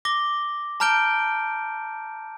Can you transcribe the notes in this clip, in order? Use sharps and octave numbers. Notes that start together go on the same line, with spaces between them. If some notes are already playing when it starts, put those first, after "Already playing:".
D6 A#6 G7
A5 A#5 F6 G6 D7 G7